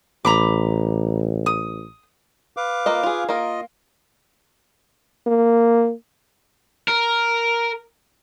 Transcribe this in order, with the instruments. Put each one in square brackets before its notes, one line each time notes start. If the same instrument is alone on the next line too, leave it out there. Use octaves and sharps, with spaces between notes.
[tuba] A1 [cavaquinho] A#5 B5 D6
[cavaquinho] D#6
[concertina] B4 F5 D6
[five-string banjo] A#3 F4 D#5
F4 G#4
[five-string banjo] A#3 A#4 [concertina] F4 D#5
[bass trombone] A#3
[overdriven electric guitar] A#4